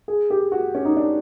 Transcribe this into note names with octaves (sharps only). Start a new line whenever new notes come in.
G#4
G4
F#4
C#4
D#4
D4